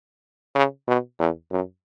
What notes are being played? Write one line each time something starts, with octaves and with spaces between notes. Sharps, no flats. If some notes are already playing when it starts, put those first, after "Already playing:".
C#3
B2
E2
F#2